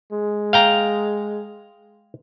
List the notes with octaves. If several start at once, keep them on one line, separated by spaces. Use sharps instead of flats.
G#3
F5 G5 A#5